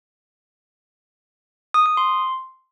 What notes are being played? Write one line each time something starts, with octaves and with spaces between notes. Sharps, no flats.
D#6
D#6
C6